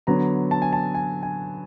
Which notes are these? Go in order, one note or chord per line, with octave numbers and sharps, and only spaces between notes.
D3 F#3 B3 A#5
A5
G#5
A5
G#5
G#5